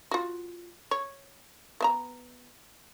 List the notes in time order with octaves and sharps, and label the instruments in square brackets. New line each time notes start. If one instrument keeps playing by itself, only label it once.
[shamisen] F4 F#4
C#5
B3 E5 A#5